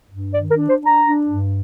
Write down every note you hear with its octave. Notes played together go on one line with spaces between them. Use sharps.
G2
D#3 D5
A#4
D4
C5
D4 A#5
D4
G2